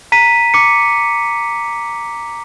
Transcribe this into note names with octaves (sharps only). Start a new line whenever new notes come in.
A#5 B6 D#7
D6 C#7